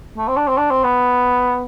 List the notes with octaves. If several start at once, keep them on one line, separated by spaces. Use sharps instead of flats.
A3
C4
D4
C4
D4
C4
B3